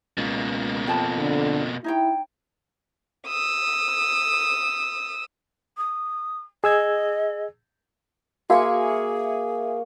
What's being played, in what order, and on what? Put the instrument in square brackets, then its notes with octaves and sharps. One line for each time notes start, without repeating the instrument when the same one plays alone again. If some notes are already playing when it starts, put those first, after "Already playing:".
[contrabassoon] C#2 [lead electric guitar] B2 A#3
[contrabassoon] F2 [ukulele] G5 A5 B5
[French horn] D3
[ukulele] D#4 C#5 G5 [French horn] E4
[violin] D#6 E6
[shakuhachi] D#6
[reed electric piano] G#4 E6 G#6 [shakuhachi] D#5
[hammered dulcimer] A#3 C#6 [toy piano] F#4 F5 [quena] G#4 [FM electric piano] E5 G#5